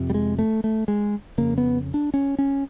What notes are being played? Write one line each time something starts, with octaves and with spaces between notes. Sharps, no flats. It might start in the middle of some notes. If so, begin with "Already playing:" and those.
Already playing: F2 C3
G3
G#3
A3
A3
G#3
F2 C#3 A#3
B3
D4
C#4
C#4